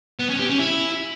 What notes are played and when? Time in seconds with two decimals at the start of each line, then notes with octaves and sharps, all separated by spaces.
0.19 B3
0.29 C#4
0.39 G4
0.49 C#4
0.59 E4